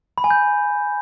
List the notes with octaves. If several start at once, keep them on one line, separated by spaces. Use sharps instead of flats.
B5
G#5
G6